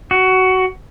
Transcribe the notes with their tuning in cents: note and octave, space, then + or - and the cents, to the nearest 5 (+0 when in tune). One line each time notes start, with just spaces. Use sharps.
F#4 +15